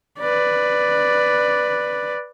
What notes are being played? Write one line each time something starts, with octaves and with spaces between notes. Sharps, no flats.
B4 D5